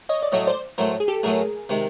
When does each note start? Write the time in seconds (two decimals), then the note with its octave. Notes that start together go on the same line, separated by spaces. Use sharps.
0.09 C#5 D#5
0.23 D5
0.32 A2 F#3 A3 C#5 D#5
0.47 C5 D5
0.78 A2 F#3 A3 A#4 C5
1.00 G#4
1.08 G4 A4
1.23 A2 F#3 A3 G#4 A#4
1.69 C3 D#3 G#3